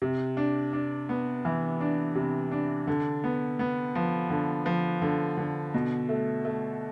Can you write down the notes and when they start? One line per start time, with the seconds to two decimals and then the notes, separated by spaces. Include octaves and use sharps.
0.02 C3
0.37 D4
0.73 D4
1.09 B3
1.45 E3
1.81 D4
2.15 C3
2.51 D4
2.87 D3
3.24 B3
3.59 B3
3.95 F3
4.30 D3
4.66 F3
5.02 D3
5.37 D3
5.74 B2
6.09 A3
6.45 A3